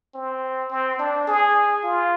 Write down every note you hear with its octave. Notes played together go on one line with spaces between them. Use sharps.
C4
C4
D4
G#4
F4